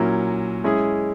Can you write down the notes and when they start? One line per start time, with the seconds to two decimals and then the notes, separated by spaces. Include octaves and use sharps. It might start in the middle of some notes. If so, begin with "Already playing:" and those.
Already playing: A#2 F#3 C#4 E4 A#4
0.64 G#3 C#4 E4 G#4